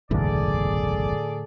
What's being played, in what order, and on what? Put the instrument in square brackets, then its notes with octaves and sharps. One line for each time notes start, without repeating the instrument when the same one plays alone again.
[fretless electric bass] F#1 B1 E2 [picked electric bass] A2 D3 [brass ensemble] G#4 A4 D5